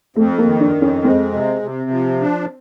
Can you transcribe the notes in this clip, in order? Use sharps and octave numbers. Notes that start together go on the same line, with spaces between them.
F2 A3
A#3
D#3
D4
F2
C#4
G#3 C4
C3
C3
F3
D4